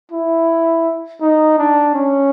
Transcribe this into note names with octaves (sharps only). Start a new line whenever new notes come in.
E4
D#4
D4
C#4